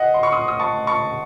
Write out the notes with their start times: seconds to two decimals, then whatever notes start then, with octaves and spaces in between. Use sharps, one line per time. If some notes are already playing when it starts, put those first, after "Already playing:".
Already playing: D#5 F#5
0.14 C6
0.23 C#6
0.32 C6 D#6
0.48 D#6
0.59 A5 C#6
0.87 A5 C#6